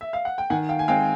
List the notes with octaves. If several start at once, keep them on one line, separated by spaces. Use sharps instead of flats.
E5
F5
F#5
G5
D#3 F#5 G#5
F5 G5
G#5
G#3 C4 F5 G5